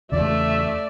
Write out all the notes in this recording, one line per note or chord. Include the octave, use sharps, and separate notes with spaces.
E2 C#3 A3 D5 E5